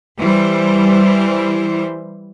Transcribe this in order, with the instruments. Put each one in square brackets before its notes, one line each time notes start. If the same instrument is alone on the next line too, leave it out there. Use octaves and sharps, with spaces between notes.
[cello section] E3 G3 C5